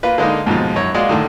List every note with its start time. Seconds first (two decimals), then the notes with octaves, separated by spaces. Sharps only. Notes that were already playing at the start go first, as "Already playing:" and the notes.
0.03 A#3 F4 B4
0.18 D3 G#3 A#3 D#4
0.46 D#2 G#2 B2 F3
0.76 F#2 C#5
0.95 G#3 A#3 F4 F#4 D5
1.09 A2 D3 D#3